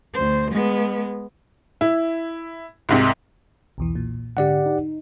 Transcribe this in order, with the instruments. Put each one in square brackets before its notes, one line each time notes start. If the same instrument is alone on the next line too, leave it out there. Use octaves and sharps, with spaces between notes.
[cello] D2 C5
G#3 B3
[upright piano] E4
[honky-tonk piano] C2 G#2 C3
[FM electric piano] B1 E2 E3
A#2
[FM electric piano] G#2 D3 [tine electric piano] G4 D5 F#5
[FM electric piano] D#4